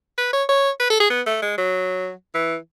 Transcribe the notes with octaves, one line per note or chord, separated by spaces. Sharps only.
B4
C#5
C#5
B4
A4
G#4
B3
A3
G#3
F#3
E3